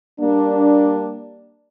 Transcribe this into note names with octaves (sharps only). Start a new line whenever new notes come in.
G3 A#3 D4